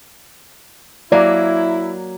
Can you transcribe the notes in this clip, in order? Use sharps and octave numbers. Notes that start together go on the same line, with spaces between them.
F#3 A#3 E4 D5